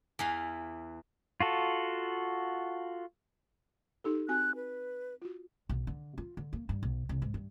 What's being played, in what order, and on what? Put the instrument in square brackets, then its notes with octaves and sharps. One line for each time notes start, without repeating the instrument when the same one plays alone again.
[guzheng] E2 E3 F5
[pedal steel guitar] F4 F#4 A4
[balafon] D#4 G4 A4
[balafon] C4 F#4 G#5 [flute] F#6
[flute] B4
[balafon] F4 F#4
[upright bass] B1
D3
F4
D3
A#3
G2
B1
C2
G#2
G2